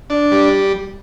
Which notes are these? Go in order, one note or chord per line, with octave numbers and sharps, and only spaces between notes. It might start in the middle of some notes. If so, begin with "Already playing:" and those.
D4
G3